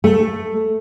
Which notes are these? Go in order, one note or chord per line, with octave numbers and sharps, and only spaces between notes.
A3